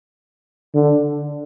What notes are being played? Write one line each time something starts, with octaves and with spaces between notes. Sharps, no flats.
D3